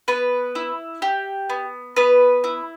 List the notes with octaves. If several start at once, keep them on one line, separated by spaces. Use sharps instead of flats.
B3 B4
E4
G4
B3
B3 B4
E4